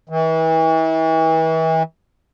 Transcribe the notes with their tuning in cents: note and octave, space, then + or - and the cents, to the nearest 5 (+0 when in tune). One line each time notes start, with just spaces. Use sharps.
E3 -35